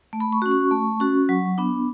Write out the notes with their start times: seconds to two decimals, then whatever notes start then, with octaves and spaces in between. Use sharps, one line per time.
0.13 A3
0.20 B5
0.32 C#6
0.42 C#4 F#4
0.51 C#6
0.71 A3
1.00 C#4 F#4
1.29 F#3
1.58 B3 D4